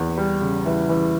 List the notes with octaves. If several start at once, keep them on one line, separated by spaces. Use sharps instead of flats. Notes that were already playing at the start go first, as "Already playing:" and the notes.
Already playing: E2
G3
C#3
E3
E3